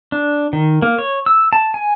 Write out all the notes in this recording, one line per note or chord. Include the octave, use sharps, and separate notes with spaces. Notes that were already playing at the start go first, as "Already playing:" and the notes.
D4
D#3
A#3
C#5
E6
A5
G#5